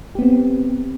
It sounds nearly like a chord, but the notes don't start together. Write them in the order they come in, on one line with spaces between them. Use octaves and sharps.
G4 B3 C4